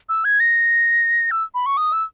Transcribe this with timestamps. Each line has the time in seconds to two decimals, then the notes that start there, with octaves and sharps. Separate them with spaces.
0.09 E6
0.25 G#6
0.40 A#6
1.31 E6
1.54 B5
1.66 C#6
1.77 D#6
1.93 E6